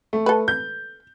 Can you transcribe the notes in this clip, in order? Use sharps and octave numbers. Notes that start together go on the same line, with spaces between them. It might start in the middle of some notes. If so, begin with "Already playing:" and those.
A3
A4 B4
G6